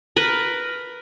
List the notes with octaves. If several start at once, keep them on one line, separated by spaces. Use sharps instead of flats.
A#4 B4